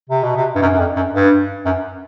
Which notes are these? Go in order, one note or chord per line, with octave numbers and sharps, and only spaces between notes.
C3
B2
C3
G2
F#2
F#2
F2
F#2
G2
F#2